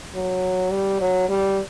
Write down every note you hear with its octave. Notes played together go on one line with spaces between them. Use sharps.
F#3
G3
F#3
G3